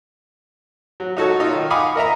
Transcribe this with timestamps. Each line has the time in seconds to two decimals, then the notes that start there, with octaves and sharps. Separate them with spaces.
1.00 F#3
1.17 D#4 F#4 A4 C#5
1.40 D#4 F4
1.53 D#3
1.70 F5 F#5 G#5 B5 D6 D#6
1.96 A#4 D#5 E5 A#5